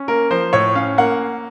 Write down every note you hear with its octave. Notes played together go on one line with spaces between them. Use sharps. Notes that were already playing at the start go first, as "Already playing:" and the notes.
Already playing: C#4
A#3 A#4
F3 C5
A2 C#5
C#4 F5
A#3 F#5